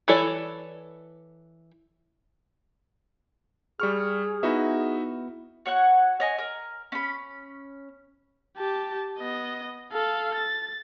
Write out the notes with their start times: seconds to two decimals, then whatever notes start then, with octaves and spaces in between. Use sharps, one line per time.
0.08 E3 E4 A4 C#5 D5
3.80 G3 G#4 C#6 F6
4.43 B3 D#4 E4 F#4 E5
5.66 F#4 C#5 F#5 F#6
6.20 C#5 D#5 G#5
6.38 A#4
6.92 C#4 B5
8.57 G4 A5
9.19 B3 D#5
9.93 A4 F5
10.35 A6